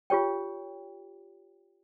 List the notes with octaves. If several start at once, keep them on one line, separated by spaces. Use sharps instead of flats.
F4 G4 C#5 G5